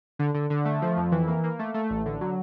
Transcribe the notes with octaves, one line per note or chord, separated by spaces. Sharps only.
D3
D3
D3
A3
F3
F2
E3
A#3
A#3
A3
A3
A1
D3
F#3